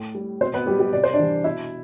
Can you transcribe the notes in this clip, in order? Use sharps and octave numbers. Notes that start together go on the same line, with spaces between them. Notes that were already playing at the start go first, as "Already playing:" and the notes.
Already playing: A2
G3
B2 C4 C5
B3 B4
F#3 G3 G4
G3 G4
C3 D5
C5
D4 D5
E3 G3
B2 E4 E5